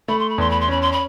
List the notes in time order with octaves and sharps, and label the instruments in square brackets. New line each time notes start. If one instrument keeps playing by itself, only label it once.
[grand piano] A3 [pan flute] B5
[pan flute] C6
B5
[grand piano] E2 [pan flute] C6
[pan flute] B5
C6
[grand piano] C#4 [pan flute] B5
[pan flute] C6
B5